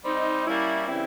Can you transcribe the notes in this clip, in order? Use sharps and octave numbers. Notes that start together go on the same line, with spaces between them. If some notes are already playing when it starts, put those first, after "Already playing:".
G3 C4 D#4
G3 A#3 C#4 E4
C#3 E3 G3 C4 E4